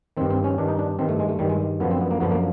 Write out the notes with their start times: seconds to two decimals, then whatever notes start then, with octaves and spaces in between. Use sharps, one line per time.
0.17 G2 D#3 C4
0.30 C4
0.44 C#4
0.58 G2 D#3 D4
0.68 D#4
0.79 D4
0.99 G2 D#3 C4
1.09 A3
1.19 G#3
1.29 A3
1.39 G2 D#3 G3
1.50 G#3
1.80 F#2 D3 F3 B3
1.91 C4
2.01 B3
2.11 A#3
2.20 F#2 D3 F3 B3
2.31 A#3